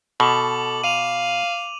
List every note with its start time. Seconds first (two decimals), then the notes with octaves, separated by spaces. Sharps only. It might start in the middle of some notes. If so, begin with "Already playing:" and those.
0.20 B2 A4 D6 F#7
0.84 F5 D#7 F7